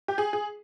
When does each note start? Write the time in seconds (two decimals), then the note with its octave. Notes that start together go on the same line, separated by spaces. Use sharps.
0.08 G4
0.18 G#4
0.33 G#4